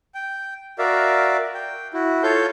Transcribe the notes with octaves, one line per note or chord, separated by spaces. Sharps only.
G5
F#4 A#4 D5 E5 F5
G5
E4 F#4
F4 A4 C#5 F5 G6